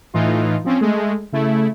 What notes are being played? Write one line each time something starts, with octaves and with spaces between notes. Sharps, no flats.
A2 E3 D#4 F4
F3 C4 C#4
G#3 A3
C#3 A3 E4